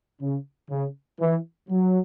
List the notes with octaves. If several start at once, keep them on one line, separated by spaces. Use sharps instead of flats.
C#3
C#3
E3
F#3